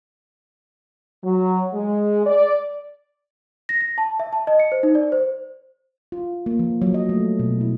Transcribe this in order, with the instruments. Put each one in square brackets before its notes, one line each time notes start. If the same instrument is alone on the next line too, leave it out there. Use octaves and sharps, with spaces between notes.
[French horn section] F#3
G#3
D5
[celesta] A#6
A#6
A5
E5
A5
D#5
C#7
C5
D#4
D5
C5
[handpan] F4
A#3
F3
F#3
D#5
A3
B2
E4